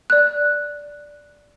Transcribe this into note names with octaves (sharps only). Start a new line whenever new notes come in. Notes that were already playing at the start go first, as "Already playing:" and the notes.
D5 F#6